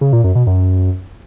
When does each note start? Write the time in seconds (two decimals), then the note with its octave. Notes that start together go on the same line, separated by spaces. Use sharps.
0.01 C#3
0.13 A#2
0.24 F#2
0.35 B2
0.47 F#2